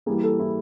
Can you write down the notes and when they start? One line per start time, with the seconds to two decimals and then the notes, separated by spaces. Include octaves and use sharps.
0.06 E3 G3 A#3 G#4
0.23 A4
0.40 E4